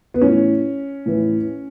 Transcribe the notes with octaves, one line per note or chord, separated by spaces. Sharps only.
B3
A2 E3 C#4
A2 E3